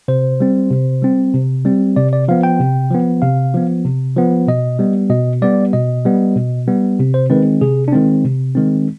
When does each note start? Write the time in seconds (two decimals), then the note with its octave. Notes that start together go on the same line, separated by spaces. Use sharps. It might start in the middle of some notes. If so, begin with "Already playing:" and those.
0.08 C3 C5
0.40 G3 C4
0.71 C3
1.02 G3 C4
1.34 C3
1.65 G3 C4
1.96 C3 D5
2.13 D5
2.28 F3 B3 F5
2.43 G5
2.60 C3
2.91 F3 B3
3.22 C3 F5
3.54 F3 B3
3.85 C3
4.17 F3 B3
4.47 B2 D#5
4.79 G3 B3
5.10 B2 D#5
5.42 G3 B3 D5
5.73 B2 D#5
6.05 G3 B3
6.36 B2
6.67 G3 B3
6.99 C3
7.14 C5
7.30 D#3 G#3 C4 B4
7.61 C3 G#4
7.88 D4
7.93 D#3 G#3 C4
8.25 C3
8.55 D#3 G#3 C4